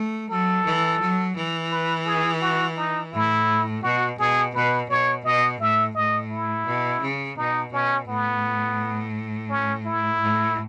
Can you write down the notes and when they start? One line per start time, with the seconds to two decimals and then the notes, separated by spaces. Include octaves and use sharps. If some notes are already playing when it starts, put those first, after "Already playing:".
Already playing: A3
0.30 F#3 A4
0.65 E3
1.00 F#3
1.36 E3
1.72 B4
2.06 G#4
2.41 F#4
2.77 D#4
3.12 A2 E4
3.83 B2 F#4
4.19 B2 G#4
4.55 B2 B4
4.90 B2 C#5
5.25 B2 D#5
5.60 A2 E5
5.95 A2 D#5
6.31 E4
6.66 B2
7.01 C#3
7.37 B2 D#4
7.72 B2 C#4
8.08 A2 B3
9.50 C#4
9.86 E4
10.20 A2